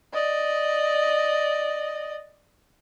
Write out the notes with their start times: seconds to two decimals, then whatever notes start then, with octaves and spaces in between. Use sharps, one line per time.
0.13 D5 D#5